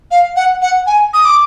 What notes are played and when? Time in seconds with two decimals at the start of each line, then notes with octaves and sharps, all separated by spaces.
0.11 F5
0.36 F#5
0.62 F#5
0.87 G#5
1.14 D#6
1.25 D6